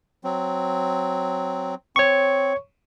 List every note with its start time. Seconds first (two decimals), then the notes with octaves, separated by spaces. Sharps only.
0.24 F#3 C4
1.96 C4 C#5 C#6